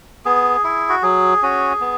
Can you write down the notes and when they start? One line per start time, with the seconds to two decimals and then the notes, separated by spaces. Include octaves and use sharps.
0.25 B3 G#4
0.64 E4
0.89 F#4
1.03 F#3 G#4
1.42 C#4 F#4
1.81 B3